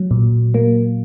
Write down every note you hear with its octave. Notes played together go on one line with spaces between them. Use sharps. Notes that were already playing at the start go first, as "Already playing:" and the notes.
Already playing: F#3
A#2
A#3